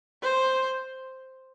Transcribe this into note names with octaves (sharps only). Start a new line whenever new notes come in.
C5